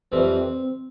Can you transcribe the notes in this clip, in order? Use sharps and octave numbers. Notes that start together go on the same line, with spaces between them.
F2 E3 G3 C4